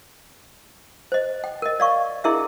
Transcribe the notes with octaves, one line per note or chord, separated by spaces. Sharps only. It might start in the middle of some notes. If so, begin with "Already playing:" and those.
C5 D#5
G5
A#4 D#5
D5 F5 C#6
D4 E4 G#4 A#4 D#5 E5